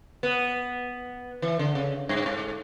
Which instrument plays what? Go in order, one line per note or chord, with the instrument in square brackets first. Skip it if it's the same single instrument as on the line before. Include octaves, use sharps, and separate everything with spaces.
[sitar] B3
E3
D3
C#3
G2
G#2